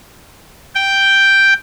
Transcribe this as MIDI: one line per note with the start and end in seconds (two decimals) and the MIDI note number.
0.75 1.54 79